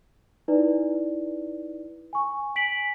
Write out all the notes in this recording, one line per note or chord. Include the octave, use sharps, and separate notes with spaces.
D#4 E4 B4 D5
G#5 C#6
G#5 B6 D7 F#7